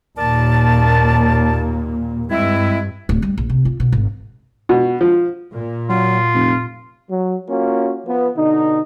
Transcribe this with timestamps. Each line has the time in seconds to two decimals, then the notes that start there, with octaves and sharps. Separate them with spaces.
0.17 D#2 A#2 A#3 A#4 D5 A5
2.30 G2 G#3 C4 E4
3.09 D1
3.22 G3
3.38 A#1
3.50 C3
3.65 F4
3.80 B2
3.92 G#1
4.69 B2
5.01 F3
5.52 A#2
5.89 F#3 F4
6.34 F1
7.10 F#3
7.48 A#3 C#4 F4 F#4
8.05 F3 B3
8.36 B2 D3 D#4